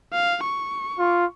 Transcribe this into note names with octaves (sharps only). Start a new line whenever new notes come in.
F5
C#6
F4